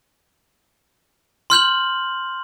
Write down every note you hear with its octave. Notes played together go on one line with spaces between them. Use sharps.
C6 F6 G6 F#7